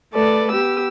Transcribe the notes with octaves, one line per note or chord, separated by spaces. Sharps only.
A3 A4 B4 D5
B3 G4 E6